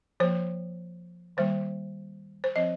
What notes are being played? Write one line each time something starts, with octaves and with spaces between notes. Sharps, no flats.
F3 A#3 C5
D#3 G3 A#3 C5
C5
F3 C4 D#5